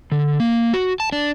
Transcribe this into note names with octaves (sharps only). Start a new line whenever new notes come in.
D3
A#3
F#4
A5
D4